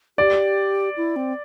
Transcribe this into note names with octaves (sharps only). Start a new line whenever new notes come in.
G4 D5
E4
C4